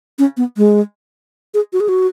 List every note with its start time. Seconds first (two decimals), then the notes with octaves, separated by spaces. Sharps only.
0.19 C#4
0.37 B3
0.57 G#3
1.54 G#4
1.73 F#4
1.80 G#4
1.89 F#4